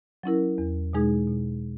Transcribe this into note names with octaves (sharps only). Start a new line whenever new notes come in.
F#3 C#4 E4 A#4
E2
B2 G#3 D#4 G#4
B2